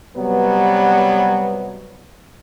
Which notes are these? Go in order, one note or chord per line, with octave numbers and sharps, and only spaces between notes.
C3 F#3 G3 B3